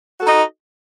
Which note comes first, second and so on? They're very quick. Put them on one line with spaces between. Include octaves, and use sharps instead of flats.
F#4 A4 D#4 D#5